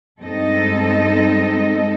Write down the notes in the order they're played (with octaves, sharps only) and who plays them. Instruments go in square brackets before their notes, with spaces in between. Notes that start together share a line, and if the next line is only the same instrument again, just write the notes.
[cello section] G2 G#3 C4 D#4 A4 D#5